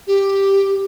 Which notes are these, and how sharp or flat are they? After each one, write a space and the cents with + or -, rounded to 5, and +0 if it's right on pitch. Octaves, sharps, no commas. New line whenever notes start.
G4 +5